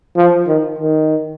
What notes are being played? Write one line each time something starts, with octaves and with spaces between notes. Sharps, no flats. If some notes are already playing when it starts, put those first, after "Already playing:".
F3
D#3
D#3